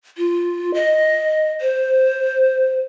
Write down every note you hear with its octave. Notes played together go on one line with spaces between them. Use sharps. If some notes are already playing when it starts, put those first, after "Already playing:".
F4
D#5
C5